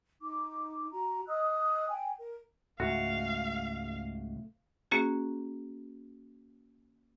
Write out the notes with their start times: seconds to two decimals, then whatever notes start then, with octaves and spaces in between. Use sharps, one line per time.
0.21 D#4 D6
0.91 F#4 A#5
1.27 D#5 D#6 E6 F#6
1.89 G5 G#5
2.19 A#4
2.80 C#2 G#2 A3 F#4 F5
4.91 A#3 C#4 F#4 G#4